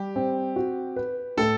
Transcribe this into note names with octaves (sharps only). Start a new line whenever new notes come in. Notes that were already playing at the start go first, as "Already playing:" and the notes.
Already playing: G3 G4
C4
F#4
B4
A2 A4